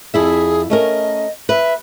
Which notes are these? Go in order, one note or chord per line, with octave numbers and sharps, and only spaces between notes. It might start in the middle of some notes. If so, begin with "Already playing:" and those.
F2 E4 G#4 E5
A3 C#4 A#4 D#5
B4 E5